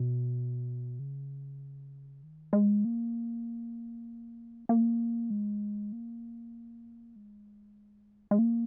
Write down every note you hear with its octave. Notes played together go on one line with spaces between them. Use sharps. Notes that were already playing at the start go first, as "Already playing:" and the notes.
Already playing: B2
C#3
D#3
G#3
A#3
A#3
G#3
A#3
G#3
G#3
A#3